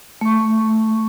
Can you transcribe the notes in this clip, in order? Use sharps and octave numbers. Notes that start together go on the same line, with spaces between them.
A3 C#6